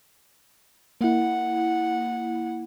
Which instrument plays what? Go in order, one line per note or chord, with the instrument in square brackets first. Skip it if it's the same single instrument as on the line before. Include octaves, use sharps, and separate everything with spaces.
[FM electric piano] A#3 E4 [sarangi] F#5